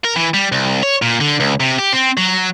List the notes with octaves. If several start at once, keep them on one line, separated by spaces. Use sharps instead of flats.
A#4
E3
G3
C2
C#5
A#2
D3
C#2
C3
G4
C4
F#3